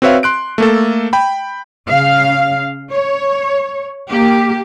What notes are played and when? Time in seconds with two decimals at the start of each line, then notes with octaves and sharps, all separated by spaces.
0.02 C4 F#4 B4 C#5 E5 F5
0.23 C6 F#6 D7
0.58 A3 A#3 A4
1.13 G5 B5
1.87 C#3 F5
2.91 C#5
4.10 A#3 G4